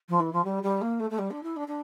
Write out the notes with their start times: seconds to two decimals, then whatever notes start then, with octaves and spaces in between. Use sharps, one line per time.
0.09 F3
0.20 E3
0.33 F3
0.44 G3
0.63 G3
0.81 A#3
1.00 A3
1.10 A3
1.18 G3
1.30 D4
1.43 E4
1.56 D4
1.68 D4